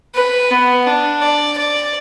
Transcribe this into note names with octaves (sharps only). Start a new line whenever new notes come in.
B4
B3
D4
D5
D5